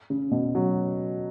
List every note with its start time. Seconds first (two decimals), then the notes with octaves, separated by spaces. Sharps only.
0.10 C#3
0.31 B2
0.55 F#3